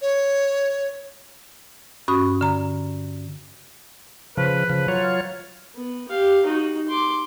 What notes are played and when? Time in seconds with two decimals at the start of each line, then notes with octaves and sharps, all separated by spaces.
0.02 C#5
2.08 G2 C#4 F#4 B5 D#6
2.41 D3 A#5
4.37 C#3 F3 B4
4.70 C#3 F3
4.88 F#3 F4 C#5
5.03 F5
5.75 B3
6.09 G4 F5
6.45 D#4 F#4
6.88 C6 D6